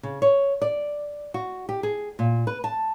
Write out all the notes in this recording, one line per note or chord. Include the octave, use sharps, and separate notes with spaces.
C#3
C#5
D5
F#4
G4
G#4
A#2
B4
A5